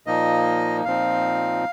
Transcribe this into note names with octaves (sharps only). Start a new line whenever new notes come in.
A#2 F3 A#3 D#4 D#5
A#2 F3 C4 D#4 F5